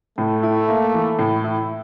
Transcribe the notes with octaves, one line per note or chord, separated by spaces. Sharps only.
A2 A3
E4
A#3
E3
A2
E4